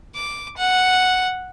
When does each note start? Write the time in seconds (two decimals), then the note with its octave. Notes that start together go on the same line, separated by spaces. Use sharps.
0.16 D6
0.58 F#5